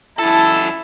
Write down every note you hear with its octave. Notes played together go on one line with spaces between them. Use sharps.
F#2 E4 A4 A5